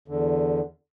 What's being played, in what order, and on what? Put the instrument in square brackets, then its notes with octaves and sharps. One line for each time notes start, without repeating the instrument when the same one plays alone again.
[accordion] E2 D3